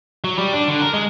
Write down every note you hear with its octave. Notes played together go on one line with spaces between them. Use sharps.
F#3
G3
D4
D3
A#4
G#3